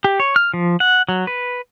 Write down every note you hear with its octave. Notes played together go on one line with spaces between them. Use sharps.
G4
C#5
F6
F3
F#5
F#3
B4